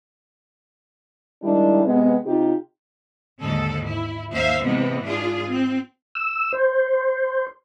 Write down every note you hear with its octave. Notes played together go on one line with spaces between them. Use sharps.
D#3 G3 G#3 D4 E4
C3 G#3 B3
C3 D#4 F4 G4
D#2 G#2 D3 A4
E4
D#2 A#3 C5 E5 F5
C3 E3 G#3 A#3 B3
G#2 D4 F4 G#4
C4
E6
C5